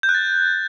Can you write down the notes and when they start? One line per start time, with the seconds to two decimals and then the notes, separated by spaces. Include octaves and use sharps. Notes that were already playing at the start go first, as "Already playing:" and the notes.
0.03 G6
0.09 F#6
0.15 A6